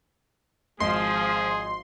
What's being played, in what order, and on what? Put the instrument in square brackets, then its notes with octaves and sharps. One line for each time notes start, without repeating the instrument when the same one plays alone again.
[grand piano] G#1 D#5 [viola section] F3 [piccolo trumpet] G#4 [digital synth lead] C6